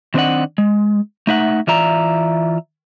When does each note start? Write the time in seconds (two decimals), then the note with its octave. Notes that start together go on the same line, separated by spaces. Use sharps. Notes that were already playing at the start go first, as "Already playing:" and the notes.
0.14 D#3 C4 D4 A#4 D#5 F#5
0.58 G#3
1.27 A3 D#4 E5 F#5
1.67 E3 F4 D5 E5 A#5